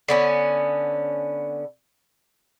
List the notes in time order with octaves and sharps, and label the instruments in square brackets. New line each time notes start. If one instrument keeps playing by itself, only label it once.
[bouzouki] D3 B3 C#4